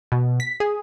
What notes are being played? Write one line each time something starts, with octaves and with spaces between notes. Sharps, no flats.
B2
B6
G#4